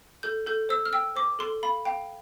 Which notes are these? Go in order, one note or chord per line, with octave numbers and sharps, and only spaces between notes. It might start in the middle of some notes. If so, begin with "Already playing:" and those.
A4 G6
A4 G6
C5 E6
F6
G5 E6
C5 D6
A4 C6
F5 B5
F5 G5